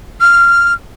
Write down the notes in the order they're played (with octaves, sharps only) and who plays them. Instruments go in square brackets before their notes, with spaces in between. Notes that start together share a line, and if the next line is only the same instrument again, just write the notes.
[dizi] F6